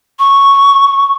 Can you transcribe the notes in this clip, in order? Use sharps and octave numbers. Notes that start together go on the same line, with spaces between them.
C#6